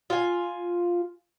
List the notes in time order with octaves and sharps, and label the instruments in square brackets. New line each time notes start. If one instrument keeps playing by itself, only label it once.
[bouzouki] F4 G#5